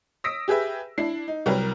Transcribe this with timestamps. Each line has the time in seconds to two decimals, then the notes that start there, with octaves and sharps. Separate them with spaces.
0.24 D#6 E6 A#6 B6 D7
0.48 G4 G#4 B4 E5
0.98 D4 E4 C7
1.28 D#4
1.46 C2 F#3 G3 A#4 B4